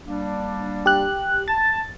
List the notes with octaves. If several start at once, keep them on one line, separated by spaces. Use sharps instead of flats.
G3 A#3 D4
G4 F#6
A5 A6